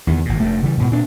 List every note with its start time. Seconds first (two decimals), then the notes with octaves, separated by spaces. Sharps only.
0.07 E2 D#3
0.25 G#1 A#2
0.40 F1 G2 A3
0.62 C#3 E3 G3
0.77 G#2 B2
0.91 A#2 C4 D4